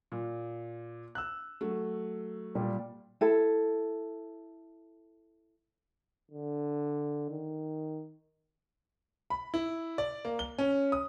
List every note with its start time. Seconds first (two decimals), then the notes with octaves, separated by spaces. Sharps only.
0.12 A#2
1.15 E6 F#6
1.61 F#3 A3
2.55 A#2 G3
3.21 E4 A4
6.31 D3
7.31 D#3
9.30 B5
9.54 E4
9.98 D5
10.25 A#3
10.39 G7
10.58 C#4
10.92 D#6